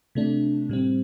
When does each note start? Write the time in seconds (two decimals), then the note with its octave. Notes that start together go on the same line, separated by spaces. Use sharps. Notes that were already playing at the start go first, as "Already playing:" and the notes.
0.15 C3 A3 D4
0.69 A2 G3 C4